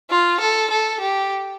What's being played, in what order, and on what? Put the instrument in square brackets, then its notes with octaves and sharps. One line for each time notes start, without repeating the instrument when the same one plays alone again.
[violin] F4
A4
A4
G4